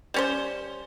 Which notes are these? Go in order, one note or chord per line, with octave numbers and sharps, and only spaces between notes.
G3 C#4 C5